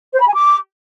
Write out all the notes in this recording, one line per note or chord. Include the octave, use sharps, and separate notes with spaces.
C5
B5
G#5
D6